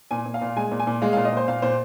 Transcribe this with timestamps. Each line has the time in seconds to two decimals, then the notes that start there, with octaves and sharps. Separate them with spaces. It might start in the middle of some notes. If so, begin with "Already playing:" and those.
0.11 A#2 G#5
0.26 A#2
0.34 F5
0.42 A#2
0.56 G#3 G#5
0.72 A#2
0.80 G#5
0.87 A#2
1.02 G#3 F5
1.13 A#2 F5
1.25 D#5
1.32 A#2 C5
1.48 A#2 F5
1.62 A#2 C5